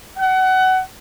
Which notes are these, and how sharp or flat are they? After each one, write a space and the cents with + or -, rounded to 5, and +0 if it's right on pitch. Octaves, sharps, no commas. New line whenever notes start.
F#5 +25